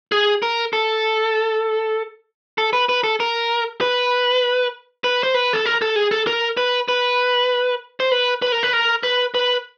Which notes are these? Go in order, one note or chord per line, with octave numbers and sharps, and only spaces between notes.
G#4
A#4
A4
A4
B4
B4
A4
A#4
B4
B4
C5
B4
A4
A#4
A4
G#4
A4
A#4
B4
B4
C5
B4
B4
A#4
B4
A#4
B4
B4